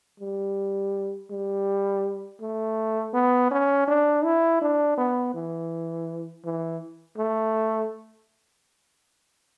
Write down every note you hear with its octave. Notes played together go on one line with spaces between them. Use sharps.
G3
G3
A3
B3
C#4
D4
E4
D4
B3
E3
E3
A3